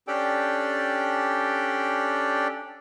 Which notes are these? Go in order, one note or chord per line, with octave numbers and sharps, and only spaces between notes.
C#4 D4 G4 A4 D5 G5